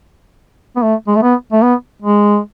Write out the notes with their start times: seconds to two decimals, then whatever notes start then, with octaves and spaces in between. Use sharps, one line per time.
0.76 B3
0.83 A3
1.08 G#3
1.16 A3
1.23 B3
1.52 A3
1.62 B3
2.02 G#3